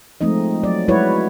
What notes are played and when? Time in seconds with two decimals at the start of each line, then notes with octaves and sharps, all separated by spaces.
0.21 F3 G#3 A3 C4 D#4 D#5
0.63 F#3 D5
0.88 F#3 G#3 E4 F#4 B4 C#5